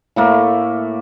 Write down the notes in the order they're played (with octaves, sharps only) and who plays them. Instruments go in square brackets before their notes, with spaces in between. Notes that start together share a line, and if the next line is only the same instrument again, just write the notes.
[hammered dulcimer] A2 A3 A#3